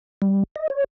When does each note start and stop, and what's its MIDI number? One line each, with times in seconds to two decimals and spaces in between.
0.22 0.43 55
0.56 0.68 75
0.70 0.84 73